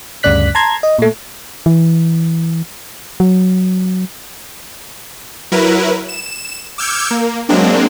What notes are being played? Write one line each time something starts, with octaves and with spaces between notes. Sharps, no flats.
D2 G2 C#3 D5 F#6 B6
A5 A#5 C6 G#6
D#5
A#2 A3
E3
F#3
F#3 E4 A#4 B4
E7
D6 E6 F6 G6 G#6 C#7
A#3
F#3 G#3 A#3 C4 D4